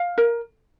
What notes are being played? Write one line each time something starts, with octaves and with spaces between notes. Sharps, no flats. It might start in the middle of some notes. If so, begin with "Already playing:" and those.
Already playing: F5
A#4